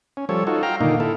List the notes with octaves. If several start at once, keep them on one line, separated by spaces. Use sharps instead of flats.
C#4
F3 G3 A4 C#5
D#4 F4 F#4 A4
F5 G5 A#5
A#2 D3 D#3 A#3 D#4
E4 A4